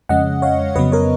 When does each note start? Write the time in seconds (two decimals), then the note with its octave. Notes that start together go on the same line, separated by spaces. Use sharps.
0.09 F2 C#3 G#3 C#4 D#5 F#5
0.42 C#5 F5
0.76 F2 C#3 F#3 B3 B4 D#5
0.92 A#4 C#5